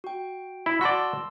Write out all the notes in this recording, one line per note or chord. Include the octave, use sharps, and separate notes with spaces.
F#4 G5
E4
F#4 D5 A5 C6 E6